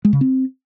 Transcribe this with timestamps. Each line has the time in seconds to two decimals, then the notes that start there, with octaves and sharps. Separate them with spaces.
0.05 G#3
0.13 C#3
0.21 C4